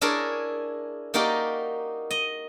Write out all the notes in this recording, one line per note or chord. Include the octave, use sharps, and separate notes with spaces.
D4 E4 G#4 A#4 C#5 D5
A#3 D#4 F#4 G4 A#4 D5
D#5